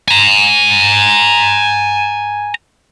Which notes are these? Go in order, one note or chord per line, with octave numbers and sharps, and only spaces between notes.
G#5 A#5